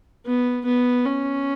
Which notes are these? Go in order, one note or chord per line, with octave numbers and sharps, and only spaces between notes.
B3
B3
C#4